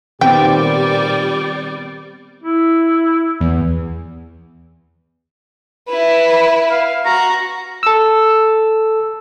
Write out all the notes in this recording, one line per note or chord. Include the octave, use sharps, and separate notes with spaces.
A#2 D#3 G3 B3 C4 G4 D5 G5
E4
E2
E4 B4
F5
F#4 A#5
A4 E6